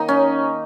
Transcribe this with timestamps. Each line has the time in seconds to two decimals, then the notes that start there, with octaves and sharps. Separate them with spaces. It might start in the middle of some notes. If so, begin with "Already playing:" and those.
Already playing: D#3 A#3 D#4
0.08 C#4